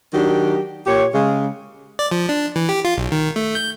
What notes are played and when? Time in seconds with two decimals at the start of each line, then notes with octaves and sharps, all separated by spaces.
0.14 D#3 F#3 D4 G4
0.87 A#2 G4 C#5
1.14 C#3 G#3
1.99 D5
2.11 F3
2.29 D4
2.56 E3
2.69 G4
2.85 F4
2.98 B1
3.12 D#3
3.36 A3
3.55 G6